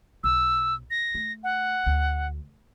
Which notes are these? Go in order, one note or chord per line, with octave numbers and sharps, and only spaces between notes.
B1 E6
A#6
A3
F#5
D2